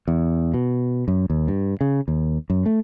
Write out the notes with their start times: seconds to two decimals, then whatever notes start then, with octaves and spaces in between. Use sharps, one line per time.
0.08 E2
0.54 B2
1.08 F#2
1.30 D#2
1.48 G2
1.81 C#3
2.08 D#2
2.50 F#2
2.66 A3